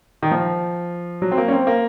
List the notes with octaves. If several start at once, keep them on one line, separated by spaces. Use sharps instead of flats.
D#3
F3
F#3
C4
A#3
C#4
C4
A#3